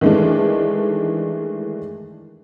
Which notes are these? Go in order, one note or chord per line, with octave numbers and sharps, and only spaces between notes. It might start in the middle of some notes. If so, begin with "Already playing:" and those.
D#3 E3 G#3 A3 D4